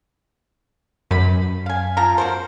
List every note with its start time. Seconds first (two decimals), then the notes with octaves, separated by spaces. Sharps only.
1.11 F#2 B4 B5
1.66 F5 G#5
1.97 F3 F4 A#5
2.18 F#4 A#4 C5